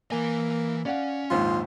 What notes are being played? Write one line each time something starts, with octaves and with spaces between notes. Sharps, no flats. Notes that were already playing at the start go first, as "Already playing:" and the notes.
E3 A#3 G#5
C#4 D5 F5 F#5
A#1 D#2 G#2 F4